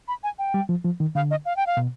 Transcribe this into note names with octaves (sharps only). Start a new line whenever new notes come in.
B5
G#5
G5
G3
F3
F3
D#3
D3 F5
D#5
F5
G5
F5
B2